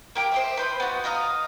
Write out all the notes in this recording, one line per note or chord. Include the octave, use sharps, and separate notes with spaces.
A#3 G4 D6
C5 D#5 E5
B4 C5 B5
B3 F#4
D#5 F5 A#5 D#6